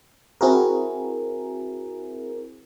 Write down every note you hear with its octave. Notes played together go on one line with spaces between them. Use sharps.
C4 E4 F#4 G#4 A#4